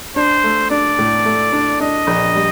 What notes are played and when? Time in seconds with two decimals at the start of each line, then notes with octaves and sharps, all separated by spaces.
0.16 D4 C5
0.44 A3
0.70 D4 D5
0.99 A2
1.26 A3
1.53 D4
1.81 D4 D#5
2.07 A#1
2.35 G3